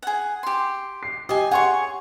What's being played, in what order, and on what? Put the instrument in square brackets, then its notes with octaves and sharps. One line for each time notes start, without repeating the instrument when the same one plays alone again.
[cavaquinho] G#4 F#5
G4 C6
[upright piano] C7
[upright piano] G4 [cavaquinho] D#5 G#5
[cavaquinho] G#4 C#5 C#6 [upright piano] F#5 C6